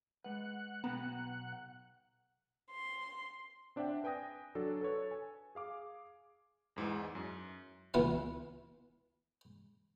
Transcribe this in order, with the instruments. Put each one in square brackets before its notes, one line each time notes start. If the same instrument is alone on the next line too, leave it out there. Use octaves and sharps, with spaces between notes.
[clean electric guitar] G#3 B4 [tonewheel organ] F#5
[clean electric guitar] B1 G5 A#5 [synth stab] B3
[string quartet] C6
[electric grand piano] C4 D4 D5 E5 F#5 G5
B4 G5 G#5 D#6 A#6
F#3 D4 A4
A4 B4 C#5
G#5
G#4 F5 D6
E2 G#2 E3 G#3
F#2
[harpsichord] C#2 E3 B3 F5